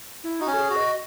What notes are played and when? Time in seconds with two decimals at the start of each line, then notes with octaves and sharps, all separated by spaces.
0.24 E4
0.40 D#4 F#4
0.47 C#4
0.54 A4
0.59 G#4
0.70 F#4
0.76 D#5